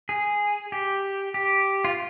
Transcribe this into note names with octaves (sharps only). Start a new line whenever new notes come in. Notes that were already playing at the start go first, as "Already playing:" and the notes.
G#4
G4
G4
F4